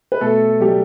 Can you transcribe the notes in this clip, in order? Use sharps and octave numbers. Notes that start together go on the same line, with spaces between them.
B4
B2 A3 A4
F#3 G3 A3 G4